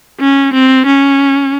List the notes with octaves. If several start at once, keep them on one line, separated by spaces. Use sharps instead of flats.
C#4
C4
C#4